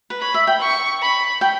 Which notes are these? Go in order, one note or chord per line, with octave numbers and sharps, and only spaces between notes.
B4
C#5 B5
E5
G5
C#6
B5
G5